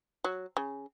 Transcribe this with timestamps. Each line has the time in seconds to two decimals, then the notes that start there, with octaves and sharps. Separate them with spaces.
0.24 F#3
0.57 C#3